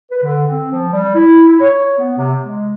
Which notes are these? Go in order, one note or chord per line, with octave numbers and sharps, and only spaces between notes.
B4
D3
C4
F3
G3
E4
E4
C#5
B3
C3
G#3